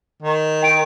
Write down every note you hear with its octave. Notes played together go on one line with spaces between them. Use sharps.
D#3
G5 D7